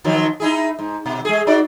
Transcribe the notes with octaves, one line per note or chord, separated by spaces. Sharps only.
D#3 F3 F#3
D#4 E4 G#4
G#2
B2
G#3 G#4
D#4 F#4 D5